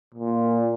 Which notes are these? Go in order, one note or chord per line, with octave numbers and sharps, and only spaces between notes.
A#2